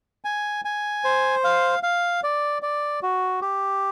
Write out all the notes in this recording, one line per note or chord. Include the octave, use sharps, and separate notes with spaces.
G#5
G#5
C5
F5
F5
D5
D5
F#4
G4